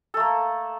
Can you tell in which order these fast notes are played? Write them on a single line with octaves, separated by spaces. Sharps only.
A4 A3 A#3